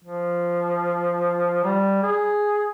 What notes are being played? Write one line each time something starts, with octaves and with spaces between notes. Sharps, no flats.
F3
G3
G#4